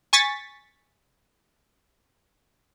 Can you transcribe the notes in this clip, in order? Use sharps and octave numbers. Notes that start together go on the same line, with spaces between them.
G#5 C#6 A6 B6